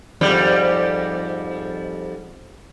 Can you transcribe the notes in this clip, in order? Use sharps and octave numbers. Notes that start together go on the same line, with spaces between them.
F2 G#2 G3